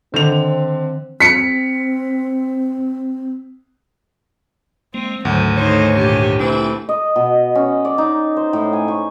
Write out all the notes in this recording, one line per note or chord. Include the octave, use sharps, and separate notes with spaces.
D3 D#3 C4 F7
C4 B6 C#7
G#3 A#3 C4
D2 G#2 D#3 F#3
E3 A3 D#4 C5 C#5
A#2 D4 G4
E3 A3 C4 D4 E4
D#5
B2
C#4
D5
D#4
C5
A2
G#5
C#6